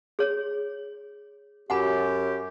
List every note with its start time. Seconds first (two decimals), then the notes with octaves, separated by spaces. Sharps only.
0.19 G#4 C#5
1.70 F#2 G4 F#5 G#5 B5